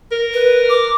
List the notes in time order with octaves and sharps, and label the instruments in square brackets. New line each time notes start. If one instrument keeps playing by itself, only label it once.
[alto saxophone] A#4
[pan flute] B4
D6